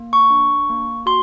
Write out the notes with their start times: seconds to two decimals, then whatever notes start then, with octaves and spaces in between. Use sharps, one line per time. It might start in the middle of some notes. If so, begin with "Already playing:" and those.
Already playing: A#3
0.13 C#6
0.31 D4
0.69 A#3
1.06 F#4 C6